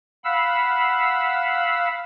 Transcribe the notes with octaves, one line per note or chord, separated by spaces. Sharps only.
F5 F#5 B5 E6